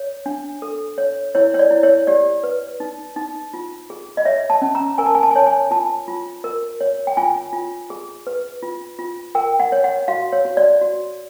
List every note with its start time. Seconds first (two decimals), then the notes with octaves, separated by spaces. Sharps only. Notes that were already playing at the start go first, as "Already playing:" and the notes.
Already playing: C#5
0.26 D4
0.62 A4
0.98 C#5
1.35 E4 C#5
1.54 C#5
1.59 D5
1.71 E4
1.83 C#5
2.07 G4 D5
2.44 B4
2.80 D#4
3.16 D#4
3.54 F4
3.90 G#4
4.17 D#5
4.25 C#5 E5
4.50 A5
4.62 C#4
4.75 A#5
4.98 A#4 G#5
5.06 A5
5.15 G#5
5.23 A5
5.31 G#5
5.36 C#5 A5
5.46 G#5
5.71 F4 A5
6.08 F4
6.44 A#4
6.81 C#5
7.07 G5
7.17 F4 G#5
7.53 F4
7.90 G#4
8.27 B4
8.63 F4
8.99 F4
9.35 A#4 G5
9.60 F#5
9.72 C#5
9.84 F#5
10.08 F#4 F5
10.32 C#5
10.45 F#4
10.57 D5
10.81 F#4